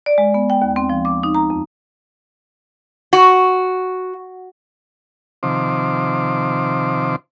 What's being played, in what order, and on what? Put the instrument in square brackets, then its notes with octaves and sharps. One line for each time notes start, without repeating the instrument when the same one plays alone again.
[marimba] D5
G#3
B3
G5
D#2
C4
F3
D6
D#4
A#5
F2
[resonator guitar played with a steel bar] F#4
[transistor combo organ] C3 D#3 F3 C5 D6